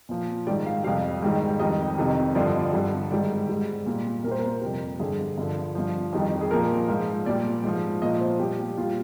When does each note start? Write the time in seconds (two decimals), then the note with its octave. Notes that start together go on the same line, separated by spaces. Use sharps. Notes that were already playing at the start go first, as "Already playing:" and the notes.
0.09 A#2 F3
0.47 G#2 D#3 G3 D5
0.66 F5
0.84 F2 C3 G3 F5
1.22 G#2 D#3 G3
1.59 F2 D#3 G3 D#5
1.98 F2 C3 D#3 G3
2.35 G2 D3 F3 D5
2.48 D#5
2.59 D5
2.73 G2 D3 G3
3.11 G#2 D#3 G3 D5
3.49 G#2 G3
3.86 A#2 G3
4.24 A#2 A#4
4.28 G3 C5
4.39 A#4
4.61 F2 C3 G3
4.99 G2 D3 G3 G#4
5.38 G2 D3 F3
5.75 G2 F3
6.13 F2 D#3 G3
6.41 G#4
6.51 A#2 F3 A#4
6.88 G#2 F3
7.26 A#2 G3 D5
7.64 G#2 F3
8.02 A#2 F3 D#5
8.21 C5
8.39 A#2 G3 G4
8.77 A#2 G3 F4